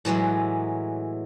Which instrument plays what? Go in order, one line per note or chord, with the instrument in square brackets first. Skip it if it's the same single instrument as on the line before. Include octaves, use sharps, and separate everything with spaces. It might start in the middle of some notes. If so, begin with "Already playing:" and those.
[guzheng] A2 E3 F#3 G#3